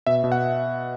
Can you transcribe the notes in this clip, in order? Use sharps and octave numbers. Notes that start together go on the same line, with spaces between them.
B2 E5
B2
F#5